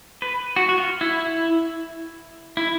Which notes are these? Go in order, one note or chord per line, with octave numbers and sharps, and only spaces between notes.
B4
F#4
F#4
F4
E4
E4